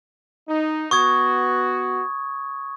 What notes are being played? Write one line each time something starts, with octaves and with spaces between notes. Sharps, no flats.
D#4
B3 F#4 C#6 D#6 G#6